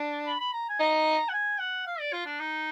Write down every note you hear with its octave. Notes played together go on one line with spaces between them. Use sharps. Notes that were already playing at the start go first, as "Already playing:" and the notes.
Already playing: D4
B5
B5
A#5
G#5
D#4 A#5
F#5
G#5
F#5
F5
D5
F4
D4
D#4